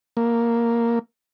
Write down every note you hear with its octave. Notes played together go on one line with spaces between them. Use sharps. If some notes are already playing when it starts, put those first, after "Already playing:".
A#3